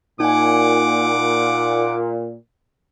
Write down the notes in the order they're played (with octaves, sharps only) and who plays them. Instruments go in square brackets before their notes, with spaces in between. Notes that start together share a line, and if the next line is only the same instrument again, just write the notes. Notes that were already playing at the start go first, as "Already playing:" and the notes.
[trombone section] A#2 [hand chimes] D#4 G#5 [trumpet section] F#5 D6